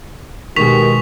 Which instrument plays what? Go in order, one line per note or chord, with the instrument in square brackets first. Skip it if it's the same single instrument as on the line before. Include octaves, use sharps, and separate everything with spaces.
[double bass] B2 G#3 [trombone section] D#3 G4 [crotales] C#6 B6 F7